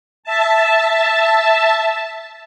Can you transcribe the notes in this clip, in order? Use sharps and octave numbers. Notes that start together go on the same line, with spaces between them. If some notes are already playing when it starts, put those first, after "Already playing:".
E5 A5